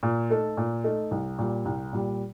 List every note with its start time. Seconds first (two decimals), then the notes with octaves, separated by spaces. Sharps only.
0.03 A#2
0.30 A3 D#4 A4
0.57 A#2
0.84 A3 D#4 A4
1.11 C2
1.38 A#2 G3
1.65 C2
1.93 A#2 G3